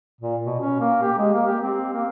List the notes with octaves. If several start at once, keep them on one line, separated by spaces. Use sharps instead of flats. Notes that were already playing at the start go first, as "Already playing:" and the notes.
A#2
B2
C#4
A#3
G4
G#3
A#3
G4
C4
A#3